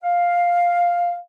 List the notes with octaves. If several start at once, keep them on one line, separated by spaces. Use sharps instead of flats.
F5